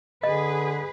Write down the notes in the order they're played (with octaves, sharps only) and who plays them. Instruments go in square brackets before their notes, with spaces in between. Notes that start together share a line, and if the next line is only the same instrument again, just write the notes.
[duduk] D3 [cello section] G#4 B4 [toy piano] D#5